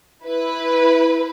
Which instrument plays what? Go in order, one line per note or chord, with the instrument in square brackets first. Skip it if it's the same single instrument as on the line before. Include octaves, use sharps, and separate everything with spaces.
[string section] E4 B4